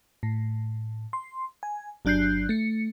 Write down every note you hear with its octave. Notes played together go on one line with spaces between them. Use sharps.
A2
C6
G#5
G1 F#3 D4 F#6 G6 C7
A3 C#7